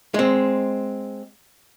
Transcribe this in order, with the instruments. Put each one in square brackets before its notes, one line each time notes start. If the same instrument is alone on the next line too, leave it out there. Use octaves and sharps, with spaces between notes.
[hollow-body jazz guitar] G#3 C4